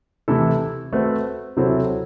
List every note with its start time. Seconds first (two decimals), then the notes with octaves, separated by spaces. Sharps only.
0.28 C3 E3 A3 E4 A4
0.93 A3 C4 F#4 B4
1.57 C3 F#3 C4 E4 A4